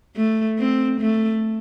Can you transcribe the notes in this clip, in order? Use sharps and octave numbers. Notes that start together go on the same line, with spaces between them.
A3
C4
A3